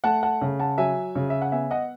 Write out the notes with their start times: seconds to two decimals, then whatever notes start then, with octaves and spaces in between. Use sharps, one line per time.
0.04 A3 F#5 A5
0.23 F#5 A5
0.42 C#3
0.59 F#5 A5
0.78 F#3 E5 G#5
1.15 C#3
1.30 E5
1.42 F#5
1.52 B3 E5 G#5
1.71 D#5 F#5